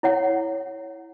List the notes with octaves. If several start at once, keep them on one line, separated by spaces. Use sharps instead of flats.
E4 C#5 F#5